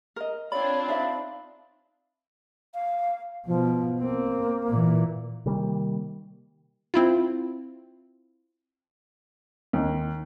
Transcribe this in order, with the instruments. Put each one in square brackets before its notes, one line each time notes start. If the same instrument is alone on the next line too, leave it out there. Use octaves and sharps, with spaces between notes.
[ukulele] A#4 D#5
[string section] C4 D4 F4 [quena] C#5 [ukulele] D5 [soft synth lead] B5
[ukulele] D#4 D5 E5 [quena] F5
[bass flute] F5
[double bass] B2 [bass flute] F3
[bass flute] A#3 [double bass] C4
[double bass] A#2 E3
[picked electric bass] C3 D#3 G3 A#3
[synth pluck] C4 E4 F4
[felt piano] D#2